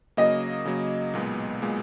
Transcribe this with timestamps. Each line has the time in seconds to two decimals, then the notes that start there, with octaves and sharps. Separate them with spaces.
0.17 C#3 F#3 A#3 D#5
0.65 C#3 F#3 A#3
1.13 B1 A#2 G#3 B3
1.62 A#2 G#3 B3